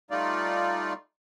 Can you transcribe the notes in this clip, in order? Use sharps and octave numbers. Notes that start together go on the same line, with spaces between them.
G3 A3 D#4 F4 D5